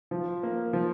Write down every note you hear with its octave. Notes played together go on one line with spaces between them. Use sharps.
F3
A#3
F3